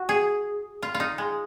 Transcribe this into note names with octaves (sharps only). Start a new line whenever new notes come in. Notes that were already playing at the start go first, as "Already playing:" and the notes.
Already playing: F#4
G#4
F4
F4
D#4
G#3